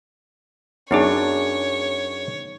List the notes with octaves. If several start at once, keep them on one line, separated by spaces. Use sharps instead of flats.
F#2 B3 D4 D#4 G#4 C#5